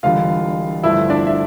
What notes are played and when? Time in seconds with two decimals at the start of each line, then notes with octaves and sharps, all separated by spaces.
0.03 E1 E2 D3 G3 F4 F5
0.83 G1 G2 F3 A3 E4 E5
1.10 D4 D5
1.27 E5